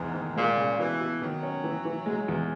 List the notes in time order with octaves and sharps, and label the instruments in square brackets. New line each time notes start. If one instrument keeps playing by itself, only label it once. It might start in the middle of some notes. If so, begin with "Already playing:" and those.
Already playing: [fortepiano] E2 [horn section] G#2
[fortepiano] D#3
[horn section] A#2 [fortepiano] G#3
[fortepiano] C#3
[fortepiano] B2 [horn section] E3
[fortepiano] B2
[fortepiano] D#3 [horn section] F#3
[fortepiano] C#4
E3
E3
G#3
E2